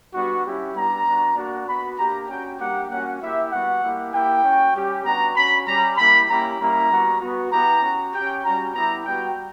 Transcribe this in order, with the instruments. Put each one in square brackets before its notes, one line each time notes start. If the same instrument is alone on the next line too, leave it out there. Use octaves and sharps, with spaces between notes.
[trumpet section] G3 B3 D4 F#4
C#4 E4 G4
G3 B3 D4 A#5
B3 D4 F#4
A#3 D4 F#4
B3 F#4 B5
A#3 D4 G4 A#5
C#4 F#4 G5
G3 A#3 D4 G4 F#5
A#3 C#4 F#4 F#5
A#3 E4 G4 E5
G3 B3 F#4 F#5
A#3 E4 G4
A#3 E4 G4 G5
C#4 F#4
G3 C#4 G4
B3 D4 F#4 A#5
C#4 F#4 B5
G3 C#4 G4 A#5
A#3 E4 G4 B5
A#3 C#4 E4 G4 A#5
G3 A#3 C#4 E4 A#5
G3 B3 F#4
B3 F#4
B3 E4 G4 A#5
C#4 F#4
C#4 G4 G5
G3 C#4 F#4 A#5
B3 E4 G4 A#5
G3 B3 F#4 G5